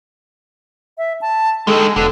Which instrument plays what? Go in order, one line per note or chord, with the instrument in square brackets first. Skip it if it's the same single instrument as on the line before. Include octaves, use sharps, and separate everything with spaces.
[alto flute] E5
A5
[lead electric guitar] D3 D#3 [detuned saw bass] G#3 [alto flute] A4
[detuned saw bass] E1 [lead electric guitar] D3 [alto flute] A4